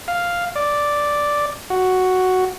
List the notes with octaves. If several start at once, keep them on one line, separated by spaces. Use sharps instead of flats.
F5
D5
F#4